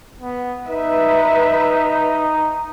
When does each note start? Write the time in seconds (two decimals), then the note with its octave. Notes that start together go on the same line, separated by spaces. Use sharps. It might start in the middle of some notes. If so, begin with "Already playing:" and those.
0.20 B3
0.67 D#4 B4 E5